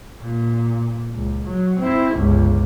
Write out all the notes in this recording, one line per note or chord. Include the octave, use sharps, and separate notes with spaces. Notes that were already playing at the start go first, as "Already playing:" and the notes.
A#2
C#2
F#3
C4 E4
G1 C#2